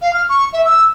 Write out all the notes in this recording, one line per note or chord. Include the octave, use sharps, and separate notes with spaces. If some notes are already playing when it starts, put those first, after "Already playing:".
F5
F6
C#6
E5
E6